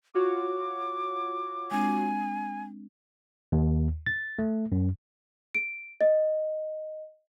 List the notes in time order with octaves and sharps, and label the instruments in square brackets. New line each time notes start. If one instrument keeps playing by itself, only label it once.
[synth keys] F4 F#4 C#5 [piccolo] D6
[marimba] G#3 C4 D4 [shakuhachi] G#5
[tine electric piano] D#2
A6
A3
F#2
[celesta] D7
D#5